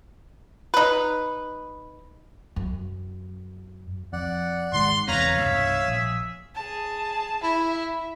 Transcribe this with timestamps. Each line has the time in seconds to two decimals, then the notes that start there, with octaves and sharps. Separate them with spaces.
0.74 D#4 B4
2.56 F#2
4.13 F2 D5 F#5
4.73 G#1 D#3 G#3 C6
5.08 F#1 E2 C3 B4 C#5 F5 A#5
5.38 C2 G2 B2 G#4 E5
5.87 A#1
6.55 G#4 A5
7.43 E4 E5